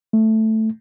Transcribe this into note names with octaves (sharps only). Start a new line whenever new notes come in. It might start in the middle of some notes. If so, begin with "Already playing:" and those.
A3